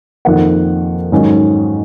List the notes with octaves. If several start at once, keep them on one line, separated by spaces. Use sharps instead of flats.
F2 D#3 A#3 F#5
G#2 D#3 F#3 C#4